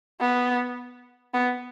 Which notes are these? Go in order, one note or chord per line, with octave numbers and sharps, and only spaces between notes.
B3
B3